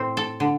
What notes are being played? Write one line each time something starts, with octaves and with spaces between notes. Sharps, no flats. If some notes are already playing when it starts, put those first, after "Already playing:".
Already playing: A2 C4
A4
D3